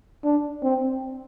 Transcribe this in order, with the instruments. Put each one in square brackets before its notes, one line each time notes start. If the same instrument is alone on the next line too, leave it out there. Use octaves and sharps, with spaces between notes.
[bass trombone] D4
C4